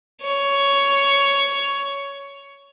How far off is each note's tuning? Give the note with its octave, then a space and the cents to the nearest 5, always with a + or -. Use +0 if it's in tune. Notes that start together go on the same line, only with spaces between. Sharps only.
C#5 +10